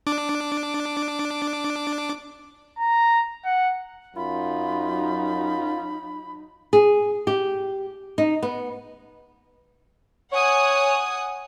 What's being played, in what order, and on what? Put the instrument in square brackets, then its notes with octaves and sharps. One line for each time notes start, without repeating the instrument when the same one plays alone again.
[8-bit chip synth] D4 D6
[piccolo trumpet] A#5
F#5
[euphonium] F#2 [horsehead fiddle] F#3 D#4 [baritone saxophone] F4 [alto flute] B5
[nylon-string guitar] G#4
G4
D#4
B3
[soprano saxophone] C#5 [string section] F#5 G#5 D#6